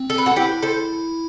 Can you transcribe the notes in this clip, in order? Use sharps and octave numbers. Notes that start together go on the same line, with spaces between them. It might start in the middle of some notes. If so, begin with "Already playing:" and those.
Already playing: C4
A4
B4
F#4 A4
E4 G4 B4
A4 C5